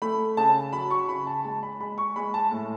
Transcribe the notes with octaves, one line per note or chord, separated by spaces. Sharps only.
A3 B5
C#3 A5
F#3 B5
C#6
C#3 B5
A5
G#3 A5
B5
G#3 B5
C#6
G#3 B5
A5
A2